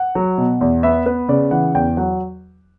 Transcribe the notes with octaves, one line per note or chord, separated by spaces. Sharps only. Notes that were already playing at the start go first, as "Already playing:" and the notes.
Already playing: F#5
F#3
B2
E2
B3 E5
B3 B4
C#3 D5
E3 F#5
E2 G5
F#3 F#5